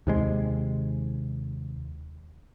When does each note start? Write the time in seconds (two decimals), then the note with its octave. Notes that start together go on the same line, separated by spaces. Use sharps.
0.07 D#2 C3 G#3